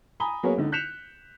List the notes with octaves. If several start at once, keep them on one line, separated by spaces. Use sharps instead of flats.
G#5 A#5 B5 D#6 G7
F#3 A#3 B3 G#4 A#4 C#5
C#2 D3 D#4
F#6 G6 B6 C#7 E7 F7